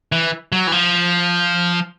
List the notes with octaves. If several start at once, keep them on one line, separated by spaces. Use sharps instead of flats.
E3
F#3
E3
F3